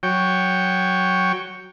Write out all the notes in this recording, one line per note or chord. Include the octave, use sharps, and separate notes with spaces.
F#3 C#5 G5